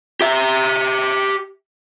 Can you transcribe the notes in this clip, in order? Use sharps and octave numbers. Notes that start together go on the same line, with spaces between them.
G4 E5